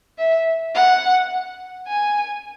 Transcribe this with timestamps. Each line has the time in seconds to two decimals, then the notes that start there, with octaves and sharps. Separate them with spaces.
0.18 E5
0.75 F#5
1.87 G#5